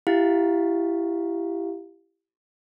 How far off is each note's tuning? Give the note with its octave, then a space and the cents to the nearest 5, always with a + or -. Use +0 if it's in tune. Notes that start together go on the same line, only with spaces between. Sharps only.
E4 +20 G4 +0 F5 +10